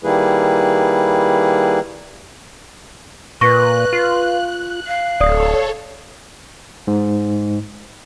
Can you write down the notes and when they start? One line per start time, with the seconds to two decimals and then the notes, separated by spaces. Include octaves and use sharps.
0.04 D#3 G3 A#3 E4 G#4 B4
3.41 A#2 B4 C#6 F#6 A#6
3.93 F4
4.87 F5
5.21 D1 A4 C#5 D5 D#6
6.87 G#2